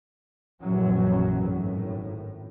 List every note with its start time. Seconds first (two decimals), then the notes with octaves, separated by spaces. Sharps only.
0.63 A#1 F#2 A2 E3 F#3 C#4
1.34 G#1 A2